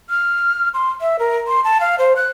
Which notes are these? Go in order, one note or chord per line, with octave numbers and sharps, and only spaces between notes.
F6
C6
E5
A#4
C6
A5
F5
C5
F#6